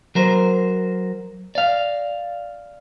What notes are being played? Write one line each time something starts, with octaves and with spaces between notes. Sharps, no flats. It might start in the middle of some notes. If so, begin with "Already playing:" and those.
F#3 A#4 C5
D5 F5